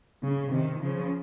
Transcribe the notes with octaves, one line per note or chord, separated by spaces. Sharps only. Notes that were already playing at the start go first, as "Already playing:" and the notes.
C#3
C3 D#3
C#3 F3